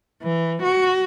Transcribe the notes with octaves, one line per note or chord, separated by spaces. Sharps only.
E3
F#4